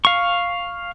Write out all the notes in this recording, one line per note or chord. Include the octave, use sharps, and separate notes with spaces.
F5 C#6